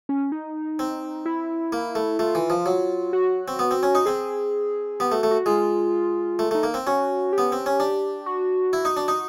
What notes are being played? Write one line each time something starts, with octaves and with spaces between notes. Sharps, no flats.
C#4
D#4
C4
E4
A#3
A3
A3 F4
E3
F3
F#3
F#4
C4
B3
C4
C#4
D#4
C4 G#4
B3 G4
A3
F#4
A3
F#4
G#3 F4
A3
A3 D#4
A#3
C4
C#4 F#4
G4
B3
C4
C#4
D4
F#4
E4
D#4
D4
D#4